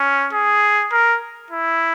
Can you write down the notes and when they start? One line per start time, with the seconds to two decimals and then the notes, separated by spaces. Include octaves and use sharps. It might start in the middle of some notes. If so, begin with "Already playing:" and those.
Already playing: C#4
0.33 G#4
0.92 A#4
1.51 E4